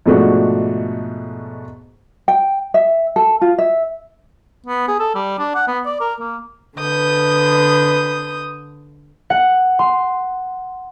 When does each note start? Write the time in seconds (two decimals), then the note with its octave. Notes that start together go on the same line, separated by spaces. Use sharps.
0.06 G#2 B2 F3 A3 D4 F#4
2.28 G5
2.74 E5
3.16 A4
3.41 F4
3.58 E5
4.66 B3
4.88 G#4
4.99 A4
5.15 G3
5.39 D4
5.55 F#5
5.68 B3
5.86 D5
6.00 A#4
6.20 A#3
6.78 D3 B4 D#6 G6
9.30 F#5
9.79 C6